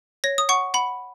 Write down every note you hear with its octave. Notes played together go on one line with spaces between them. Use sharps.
C#5 A#6
D#6
F#5 C#6
F#5 B5